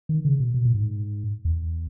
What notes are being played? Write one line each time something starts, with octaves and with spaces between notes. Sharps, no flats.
D#3
C#3
B2
B2
A#2
G#2
E2